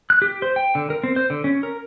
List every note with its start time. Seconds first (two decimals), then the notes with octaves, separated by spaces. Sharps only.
0.10 F#6
0.22 G4
0.42 C5
0.56 G5
0.75 D3
0.90 A#4
1.03 C4
1.16 C5
1.30 D3
1.44 C#4
1.63 A#4